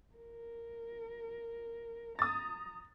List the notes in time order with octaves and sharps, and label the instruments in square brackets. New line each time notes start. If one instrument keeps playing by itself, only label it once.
[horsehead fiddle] A#4
[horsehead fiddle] A#5 [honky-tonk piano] D#6 A6